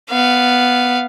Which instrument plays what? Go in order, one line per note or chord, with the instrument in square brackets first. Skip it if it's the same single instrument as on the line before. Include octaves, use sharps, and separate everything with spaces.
[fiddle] B3 F5